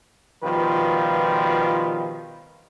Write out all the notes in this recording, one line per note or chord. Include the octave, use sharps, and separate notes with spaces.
B2 D#3 F3 G3 F4 B4